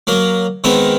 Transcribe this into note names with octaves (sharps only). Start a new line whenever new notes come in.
F#3 A#3 A#4
D#3 G#3 B3 C4 D#4 A#4